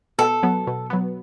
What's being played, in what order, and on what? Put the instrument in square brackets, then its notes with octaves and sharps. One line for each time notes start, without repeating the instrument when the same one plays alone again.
[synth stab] B2 [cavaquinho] A4
[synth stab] F#3 B3
B2
F#3 B3